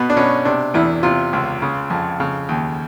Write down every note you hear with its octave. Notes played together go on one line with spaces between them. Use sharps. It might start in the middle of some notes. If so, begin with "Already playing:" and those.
Already playing: B2 B3
D4
B2 C#4
C3 D4
E2 E4
C3 F4
C#2
C#3
F2
C#3
D#2